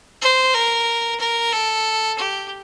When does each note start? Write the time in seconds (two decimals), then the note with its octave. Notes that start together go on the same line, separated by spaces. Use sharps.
0.21 C5
0.54 A#4
1.20 A#4
1.53 A4
2.18 G4